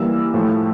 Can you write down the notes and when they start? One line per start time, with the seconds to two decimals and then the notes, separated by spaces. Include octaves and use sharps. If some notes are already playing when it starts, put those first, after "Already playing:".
Already playing: E3 G3 A#3 E6
0.34 A2 F3 A3